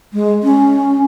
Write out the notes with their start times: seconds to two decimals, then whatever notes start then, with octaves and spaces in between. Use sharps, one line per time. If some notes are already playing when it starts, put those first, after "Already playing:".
0.13 G#3
0.43 C#4